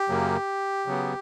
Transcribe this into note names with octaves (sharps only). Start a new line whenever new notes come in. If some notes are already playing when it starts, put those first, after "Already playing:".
Already playing: G4
F#2 C#3 F#3 A#3
C#3 F#3 B3